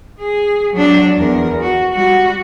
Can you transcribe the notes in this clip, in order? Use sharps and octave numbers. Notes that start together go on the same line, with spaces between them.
G#4
F#3 D4
E2 A#4
F#4
G3 F#4